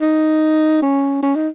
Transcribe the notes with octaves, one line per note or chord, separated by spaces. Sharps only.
D#4
C#4
C#4
D#4